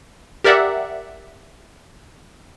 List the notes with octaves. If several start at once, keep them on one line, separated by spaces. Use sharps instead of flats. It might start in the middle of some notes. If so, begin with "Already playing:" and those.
G4 A#4 D5 E5 F#5